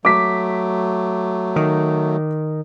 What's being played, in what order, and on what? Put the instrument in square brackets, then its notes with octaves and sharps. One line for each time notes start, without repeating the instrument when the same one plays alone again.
[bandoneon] F#3 A3 [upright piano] D6 B6
[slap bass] D#3